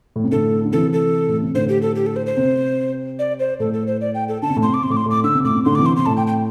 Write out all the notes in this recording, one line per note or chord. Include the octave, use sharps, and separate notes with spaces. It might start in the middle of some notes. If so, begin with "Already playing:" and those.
A2
C3
A2 D3 A4
D3
C3 E3 A4
A4
A2
C3
A2 D3 C5
G4
A4
G4
A4
C5
C5
C3
D5
C5
A2 A4
A4
C5
D5
G5
A4
D3 A5
C3
A2
C3 C6
D6
C3 C6
A2 D6
C6
A2 D6
D3 E6
C3
A2 D6
C3
A2 D3 C6
D6
C3 E3
C6
C3 C6
A2 A5
G5
G5